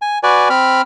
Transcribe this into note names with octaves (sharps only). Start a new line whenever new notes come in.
G#5
F#4 B4 D5 G#5
C4 B5 F6